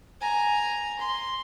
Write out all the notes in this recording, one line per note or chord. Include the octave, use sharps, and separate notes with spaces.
G#5 A#5
C6